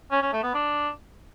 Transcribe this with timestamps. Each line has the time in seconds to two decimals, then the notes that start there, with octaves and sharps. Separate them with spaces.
0.12 C#4
0.22 C#4
0.33 A3
0.43 B3
0.54 D4